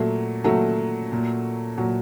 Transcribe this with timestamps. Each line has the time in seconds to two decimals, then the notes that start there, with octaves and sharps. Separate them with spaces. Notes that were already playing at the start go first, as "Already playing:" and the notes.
Already playing: A#2 F#3 A3
0.44 A#2 F#3 A3
1.12 A#2
1.78 A#2 F#3